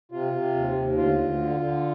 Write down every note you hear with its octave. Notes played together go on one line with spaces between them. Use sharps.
C3 F4
C3
D#2
D#2
D2 F4
D2
D3
D3